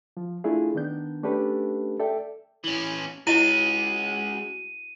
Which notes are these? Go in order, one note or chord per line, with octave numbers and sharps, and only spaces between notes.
F3
A3 D4 E4 F4 G#4
D#3 B3 D4 G6
A3 C#4 D4 G4 A4 B4
A4 D5 E5 G5
E3 C#4
G#3 C#4 E4 F#4 D#5 D#7